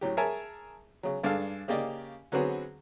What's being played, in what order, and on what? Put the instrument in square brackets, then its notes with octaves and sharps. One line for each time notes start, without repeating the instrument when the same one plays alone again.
[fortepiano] A2 F#3 G4
G#4 A#4 C#5 E5 G#5 A5
C#3 F#3
G2 D4 G#4 A4 F5
C#3 A#3 G4 D5 D#5
D3 F#3 B3 C4 F#4 G#4